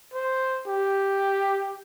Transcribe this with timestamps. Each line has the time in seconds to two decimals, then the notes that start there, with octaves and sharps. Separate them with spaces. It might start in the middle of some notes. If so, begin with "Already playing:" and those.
0.14 C5
0.67 G4